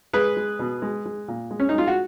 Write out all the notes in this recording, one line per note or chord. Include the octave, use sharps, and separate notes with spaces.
G#3 G#4 B4
G#3
B2
G#3
G#3
A#2
G#3
C#4
D#4
G#3 F4
F#4